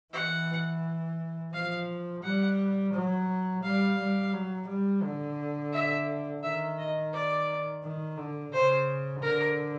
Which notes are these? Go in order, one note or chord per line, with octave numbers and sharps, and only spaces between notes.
E3 F#5
F3 F5
G3 F#5
F#3
G3 F5
G3
F#3
G3
D3
E5
D#3 E5
D#5
D5
D#3
D3
C#3 C5
D3 A#4